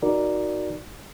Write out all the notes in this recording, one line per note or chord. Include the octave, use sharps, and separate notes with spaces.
D#4 F#4 A#4 D5